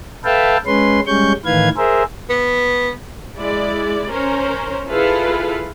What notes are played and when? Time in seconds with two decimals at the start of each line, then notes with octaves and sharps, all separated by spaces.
0.25 A4 B4 E5 F5 G5 A5
0.66 G#3 C#4 B4 C6
1.07 G3 G#3 C#4 C#6 G6
1.45 A2 D#3 E3 B4 F5 G#6
1.77 G#4 A#4 C5 E5
2.30 B3
3.37 G#3 E4 D5
4.10 C#4 A#4 C5
4.88 E4 F4 G#4 A4 B4 F5